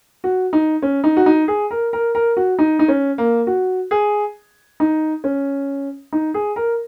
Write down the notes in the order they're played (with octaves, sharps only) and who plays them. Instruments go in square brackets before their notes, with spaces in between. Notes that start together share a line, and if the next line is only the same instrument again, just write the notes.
[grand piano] F#4
D#4
C#4
D#4
F#4
D#4
G#4
A#4
A#4
A#4
F#4
D#4
D#4
C#4
A#3
F#4
G#4
D#4
C#4
D#4
G#4
A#4